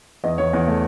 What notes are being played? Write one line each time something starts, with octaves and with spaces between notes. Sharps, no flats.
E2 D#5
E2 C#5
E2
A3